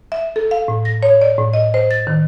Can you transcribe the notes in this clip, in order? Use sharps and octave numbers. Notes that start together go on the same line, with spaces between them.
E5
A4
F5
A2
A#6
C#5
D5
A2
D#5
C5
A6
D#3